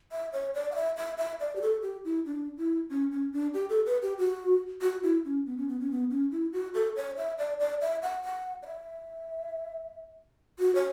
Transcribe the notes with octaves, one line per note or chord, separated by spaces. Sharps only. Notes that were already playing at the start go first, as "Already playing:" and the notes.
E5
C#5
D5
F#5
E5
E5
E5
D5
G4
A4
G4
E4
D4
E4
C#4
C#4
D4
G4
A4
B4
G4
F#4
F#4
E4
C#4
B3
C#4
B3
C#4
B3
C#4
E4
F#4
A4
C#5
E5
D5
D5
E5
F#5
F#5
D5
E5
F#4
C#5